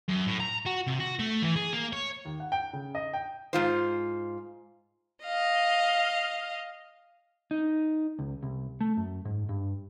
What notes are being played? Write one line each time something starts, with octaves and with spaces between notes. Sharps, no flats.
F#2
A2
A#5
F#4
C3
F#4
A3
E3
G#4
A#3
C#5
D#2
F#5
G5
C#3
D#5
G5
G#2 F4 C5
D#5 F5
D#4
C#2
C2
A3
F#2
G#2
G2